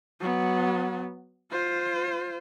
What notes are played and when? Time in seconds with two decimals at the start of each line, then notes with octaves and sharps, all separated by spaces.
0.20 F#3 B3
1.51 F4 C5